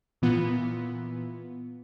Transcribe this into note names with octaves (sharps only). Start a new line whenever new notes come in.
A#2 E3 B3 F4